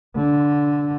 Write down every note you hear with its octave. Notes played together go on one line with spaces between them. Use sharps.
D3